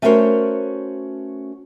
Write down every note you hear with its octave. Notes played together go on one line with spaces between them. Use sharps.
A3 C#4 F#4 A#4 C5 C#5